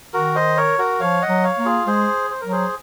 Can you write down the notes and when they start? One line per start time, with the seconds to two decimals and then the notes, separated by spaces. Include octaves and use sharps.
0.13 D#3 F#4 A#4
0.35 C5 D#5
0.57 A#4 C#5
0.79 F#4 A#4
1.00 F3 C#5 F5
1.22 D#5 F#5
1.29 F#3
1.44 C#5 F5
1.58 A#3
1.65 F4 G#4
1.87 G#3 G#4 C5
2.30 C5
2.41 F#3 A#4
2.52 G#4 C5